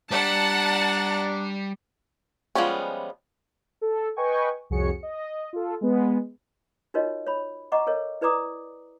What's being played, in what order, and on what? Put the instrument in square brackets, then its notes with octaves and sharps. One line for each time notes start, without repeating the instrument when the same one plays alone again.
[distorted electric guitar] G3 [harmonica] D4 A#5 [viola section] F#5 A5
[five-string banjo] F3 G3 G#3 B3 C#4
[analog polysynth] A4
B4 D#5 G5 G#5 C#6
C2 F2 F#4 G#4 C#5 C#7
D#5
F4 A4
G#3 B3
[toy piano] D#4 F4 F#4 A#4 C#5 D#5
C#5 B5
D#5 F#5 A#5 C#6 D6
A4 A#4 C#5 D#5
E4 B4 D5 A#5 D6 D#6